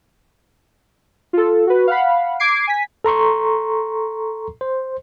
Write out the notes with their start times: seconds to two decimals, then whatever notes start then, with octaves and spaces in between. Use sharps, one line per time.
1.33 F4 A4
1.67 F#4 B4
1.87 F5 F#5 B5
2.39 D6 G#6 C7 D7
2.67 G#5 B6
3.04 A4 A#5 C6 C#6
4.61 C5